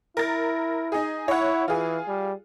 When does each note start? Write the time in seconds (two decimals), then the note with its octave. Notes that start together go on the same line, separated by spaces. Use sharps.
0.17 E4 A#4 A6
0.92 D#4 G#4
1.28 E4 C#5 F#5
1.68 E3 F4 G#4
2.08 G3